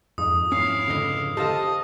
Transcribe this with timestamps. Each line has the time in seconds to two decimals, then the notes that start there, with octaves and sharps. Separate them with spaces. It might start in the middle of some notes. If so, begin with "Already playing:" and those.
0.18 F2 G#2 D#6
0.52 C#4 E4 F5
0.88 C#2 D3 D#5
1.37 G4 A4 C5 D#5 F5 A5